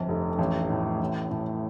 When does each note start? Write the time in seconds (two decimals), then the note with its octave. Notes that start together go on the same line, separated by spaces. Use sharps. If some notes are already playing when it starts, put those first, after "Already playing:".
Already playing: G1 F2
0.08 F1
0.39 A1
0.70 A2
1.00 A1
1.31 A2